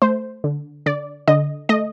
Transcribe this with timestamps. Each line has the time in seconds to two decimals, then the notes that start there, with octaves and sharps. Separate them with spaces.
0.02 A3 C5
0.44 D3
0.86 D3 D5
1.28 D3 D#5
1.69 A3 D#5